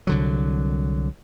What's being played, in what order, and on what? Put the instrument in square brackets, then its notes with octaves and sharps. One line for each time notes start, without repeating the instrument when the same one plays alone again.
[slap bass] C2 D3 F#3